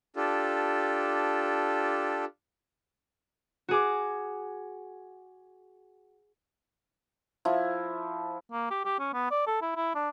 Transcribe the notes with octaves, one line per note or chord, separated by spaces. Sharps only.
D4 F4 G4 A4
F#4 G#4 D6
F3 E4
A#3
G4
G4
C#4
B3
D5
A4
E4
E4
D4